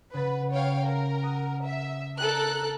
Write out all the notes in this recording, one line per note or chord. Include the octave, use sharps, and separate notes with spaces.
C#3 B4 F#5 A6
C#5 F5 G5
A#4
F#5 D#6 F#6
E5
A4 A#4 F6 F#6